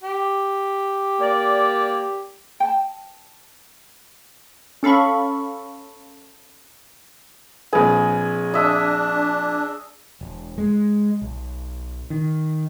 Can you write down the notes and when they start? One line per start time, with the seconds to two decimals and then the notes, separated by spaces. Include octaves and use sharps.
0.03 G4
1.20 A#3 D5
2.60 G5 A5
4.83 C#4 A4 F5 B5 C#6
7.73 A#1 C4 G#4 B4
8.54 D4 D#5 E5
10.21 E1
10.58 G#3
11.22 B1
12.10 D#3